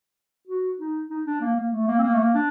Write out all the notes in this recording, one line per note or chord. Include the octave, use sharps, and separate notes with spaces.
F#4
D#4
D#4
D4
A#3
A#3
A3
A#3
C4
A#3
A3
A#3
D4